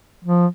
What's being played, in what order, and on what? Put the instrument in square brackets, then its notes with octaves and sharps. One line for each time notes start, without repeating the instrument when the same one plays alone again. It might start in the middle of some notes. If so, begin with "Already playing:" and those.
[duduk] F3